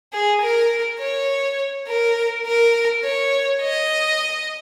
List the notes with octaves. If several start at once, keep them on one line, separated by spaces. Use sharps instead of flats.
G#4
A#4
C#5
A#4
A#4
C#5
D#5